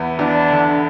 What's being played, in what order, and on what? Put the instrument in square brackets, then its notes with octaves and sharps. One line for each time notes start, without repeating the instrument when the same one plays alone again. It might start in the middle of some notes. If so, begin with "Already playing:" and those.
Already playing: [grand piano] E2 B3 E4
[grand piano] E2 [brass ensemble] D4
[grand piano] D3